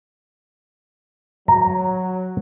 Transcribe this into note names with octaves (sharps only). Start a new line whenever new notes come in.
F#3 A#5